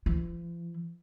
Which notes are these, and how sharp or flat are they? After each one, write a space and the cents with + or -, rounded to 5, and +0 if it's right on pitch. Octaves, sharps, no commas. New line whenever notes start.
F3 -45